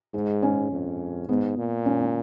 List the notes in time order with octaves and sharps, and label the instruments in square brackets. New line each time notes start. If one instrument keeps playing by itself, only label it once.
[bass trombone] G#2 [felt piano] G#3
[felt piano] C#4
[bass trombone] F2
[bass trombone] G#2 [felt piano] B3
[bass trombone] A#2
[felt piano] C#4
C#4